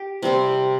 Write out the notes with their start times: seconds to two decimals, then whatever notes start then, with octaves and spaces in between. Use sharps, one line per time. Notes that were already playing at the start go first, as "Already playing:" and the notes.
Already playing: G4
0.22 C3 G3 C4 G4